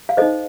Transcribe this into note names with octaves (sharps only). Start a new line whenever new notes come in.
F5
D#4 A4 C5 D#5